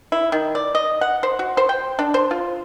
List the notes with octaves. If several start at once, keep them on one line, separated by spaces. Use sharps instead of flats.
E4
D#3
D5
D#5
F#5
C5
F#4
C5
G5
D4
C5
F4